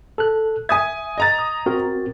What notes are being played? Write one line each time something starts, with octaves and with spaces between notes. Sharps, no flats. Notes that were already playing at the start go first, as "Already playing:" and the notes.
A4 F#6
E5 G#5 D#6 G#6
D#5 A#5 A6
D#6
C4 F#4 A#4